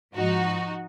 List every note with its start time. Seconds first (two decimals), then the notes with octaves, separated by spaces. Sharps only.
0.15 G#2 F3 D#4 F#4